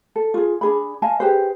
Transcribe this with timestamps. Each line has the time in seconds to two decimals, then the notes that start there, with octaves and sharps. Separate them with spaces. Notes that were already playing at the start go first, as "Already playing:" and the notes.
0.16 A4
0.34 F4 G#4
0.61 D4 G#4 B5
1.02 D#5 F5 G#5 A5
1.20 G4 G#4 B4 C5